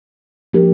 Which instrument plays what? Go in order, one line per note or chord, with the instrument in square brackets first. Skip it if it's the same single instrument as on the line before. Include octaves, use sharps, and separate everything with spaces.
[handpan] F3 A#3 D4 G4 A#4